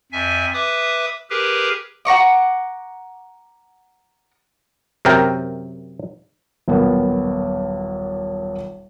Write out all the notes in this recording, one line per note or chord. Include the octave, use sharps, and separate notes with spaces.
F2 E5 G#5
B4 E5 D6 D#6
G4 G#4 A#4 B4
F#5 A#5 C#6 D6
F#2 C3 A#4 G5
D#1 B1 A#3 B3 G5